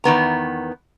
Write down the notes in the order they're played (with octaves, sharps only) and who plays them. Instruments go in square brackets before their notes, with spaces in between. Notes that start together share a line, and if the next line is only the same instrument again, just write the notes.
[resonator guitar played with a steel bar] E2 D#3 B3 A#5